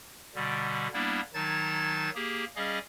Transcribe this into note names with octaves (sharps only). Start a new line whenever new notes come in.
B2 D3 G3
G3 A#3 B3 D4 E4
D#3 F#3 D#4 A5 G#6 A6
A#3 G4 G#4
G3 C#4 G#4 D#5 F5